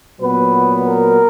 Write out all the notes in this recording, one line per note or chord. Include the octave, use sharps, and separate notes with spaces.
A#2 F#3 B3 B4
A#4